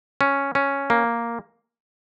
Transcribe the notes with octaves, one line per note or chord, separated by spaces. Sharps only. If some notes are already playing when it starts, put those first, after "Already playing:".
C#4
C#4
A#3